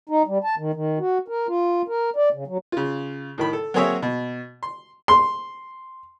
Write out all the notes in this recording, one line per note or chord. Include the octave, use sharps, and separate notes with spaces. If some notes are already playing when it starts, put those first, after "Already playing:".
D#4
G3
A5
D#3
D#3
F#4
A#4
F4
A#4
D5
C#3
F#3
C#3 F4
A2 D#3 B5
A4
F#3 A#3 C4 G#4 C#5 E5
B2
C6
C6